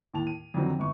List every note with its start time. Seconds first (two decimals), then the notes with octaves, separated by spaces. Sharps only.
0.14 D#2 A2 A5 F7
0.27 D#7
0.54 F2 D3 D#3 F#3 C4
0.79 G1 C#6